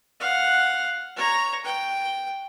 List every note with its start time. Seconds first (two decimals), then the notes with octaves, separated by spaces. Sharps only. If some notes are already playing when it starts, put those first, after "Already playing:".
0.20 F5 F#5
1.16 C#5 A#5
1.65 G5